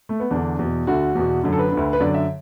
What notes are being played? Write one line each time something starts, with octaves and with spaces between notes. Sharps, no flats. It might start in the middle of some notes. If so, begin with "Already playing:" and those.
A3
B3
E2 D3 D4
E2 B2
D2 D3 F#4
E2 B2
F#2 D3
A4
B4
D3
D2
B4
F#2 D3 D5
E5